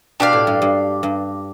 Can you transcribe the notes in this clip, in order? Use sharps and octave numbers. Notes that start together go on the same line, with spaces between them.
B2 D4 G4 D5 F5
A2
G2
G2
G2